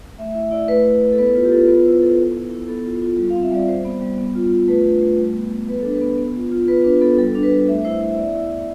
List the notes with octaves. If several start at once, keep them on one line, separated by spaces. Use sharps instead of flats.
A3 E5
E4 E5
E4 D5
A3 B4
E4
E4
A4
B3 B4
F4 B4
G4
F4 A4
B3 B4
E4 C5
E4 A4
B3 A4
E4
E4
B3 A4
F4
F4
G3
F5
C4
E5
G3 D5
G3 C5
B3
G3
B3
F4
F4
A3 B4
D4
A3
G3
B3
G3
B3 B4
D4 A4
B4
B3
B3
F4
F4
B3 B4
D4 B4
B3 A4
G3 A4
D4
B4
G3
A3 E5
E4 C5
E4 C5
E5
B3 D5
E4
E5
E4